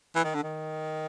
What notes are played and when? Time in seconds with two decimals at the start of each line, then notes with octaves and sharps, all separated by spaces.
0.16 E3
0.24 D#3
0.35 D3
0.44 D#3